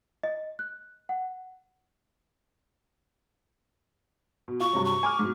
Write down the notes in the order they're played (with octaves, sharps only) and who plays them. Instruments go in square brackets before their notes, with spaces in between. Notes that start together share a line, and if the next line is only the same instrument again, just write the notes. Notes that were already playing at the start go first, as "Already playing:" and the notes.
[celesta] D#5
F#6
F#5
[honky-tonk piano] B2
[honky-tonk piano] F4 [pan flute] C#6
[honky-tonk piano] G2 C3 F#3
[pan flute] C#6
[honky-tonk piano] G#5 D6 F6
G#2 B2